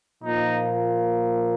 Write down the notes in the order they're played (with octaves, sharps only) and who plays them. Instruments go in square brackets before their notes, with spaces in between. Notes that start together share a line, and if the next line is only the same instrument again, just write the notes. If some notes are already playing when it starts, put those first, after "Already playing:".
[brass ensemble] A#2 F3 A#3 D#4